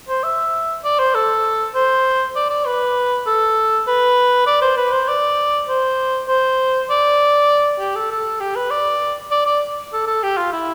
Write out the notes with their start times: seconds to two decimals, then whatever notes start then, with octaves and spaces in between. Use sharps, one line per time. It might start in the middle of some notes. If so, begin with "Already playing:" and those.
0.08 C5
0.23 E5
0.84 D5
0.99 C5
1.15 A4
1.74 C5
2.36 D5
2.50 D5
2.66 B4
3.27 A4
3.87 B4
4.47 D5
4.62 C5
4.77 B4
4.92 C5
5.08 D5
5.68 C5
6.28 C5
6.90 D5
7.80 G4
7.95 A4
8.11 A4
8.40 G4
8.56 B4
8.71 D5
9.31 D5
9.46 D5
9.93 A4
10.07 A4
10.23 G4
10.37 F4
10.52 E4